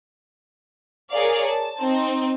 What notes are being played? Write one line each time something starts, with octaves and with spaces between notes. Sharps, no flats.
G#4 A#4 C#5 D5 F5
A5
C4 D#4